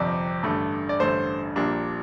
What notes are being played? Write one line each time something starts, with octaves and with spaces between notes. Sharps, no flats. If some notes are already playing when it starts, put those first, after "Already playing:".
Already playing: G1 F2 C3 D5
A1 G2 D3 A3
D5
A1 G2 D3 A3 C5
A#1 A#2 G3 A#3 D4